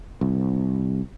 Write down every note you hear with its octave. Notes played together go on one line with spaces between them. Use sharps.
C2